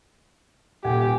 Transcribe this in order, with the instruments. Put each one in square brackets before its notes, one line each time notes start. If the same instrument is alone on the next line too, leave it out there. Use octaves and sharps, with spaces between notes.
[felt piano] D#1 F#5 G#5 [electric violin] G4